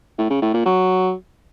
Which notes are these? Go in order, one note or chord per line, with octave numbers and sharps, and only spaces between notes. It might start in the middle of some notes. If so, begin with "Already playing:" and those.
A2
C#3
A2
A#2
F#3